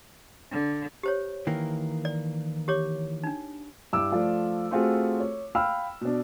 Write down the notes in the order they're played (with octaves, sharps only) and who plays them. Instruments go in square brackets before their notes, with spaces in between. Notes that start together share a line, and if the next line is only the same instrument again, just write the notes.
[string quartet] D3
[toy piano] G4 C5 C#5
[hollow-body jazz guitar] D#3 E3 A#3
[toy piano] D5
G4 C#5 D6
D4 D#4
[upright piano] G2 E4 D6 E6
F3 A3 F4 D5
A3 C4 F4 F#4 G#4
C#5
F5 G5 B5 E6 F6
B2 D4